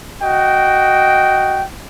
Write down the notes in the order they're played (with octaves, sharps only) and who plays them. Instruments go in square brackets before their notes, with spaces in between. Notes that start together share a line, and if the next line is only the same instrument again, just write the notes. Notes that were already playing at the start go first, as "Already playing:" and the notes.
[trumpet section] F#4 D#5 G5